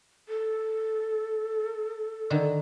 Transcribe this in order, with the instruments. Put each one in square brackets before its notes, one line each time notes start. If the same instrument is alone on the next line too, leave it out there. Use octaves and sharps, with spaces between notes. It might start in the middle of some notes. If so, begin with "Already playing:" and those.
[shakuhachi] A4
[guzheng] D3 D#3